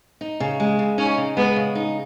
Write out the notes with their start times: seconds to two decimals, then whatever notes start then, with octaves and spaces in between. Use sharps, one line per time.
0.21 D#4
0.40 C#3
0.60 G#3
0.79 C#3
0.98 C#4 D#4
1.18 C#3
1.37 G#3 B3
1.56 C#3
1.75 D#4